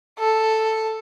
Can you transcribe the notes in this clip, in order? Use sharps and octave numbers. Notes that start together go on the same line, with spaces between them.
A4